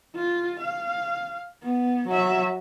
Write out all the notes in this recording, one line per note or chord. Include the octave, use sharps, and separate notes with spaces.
F4
F5
B3
F#3 E5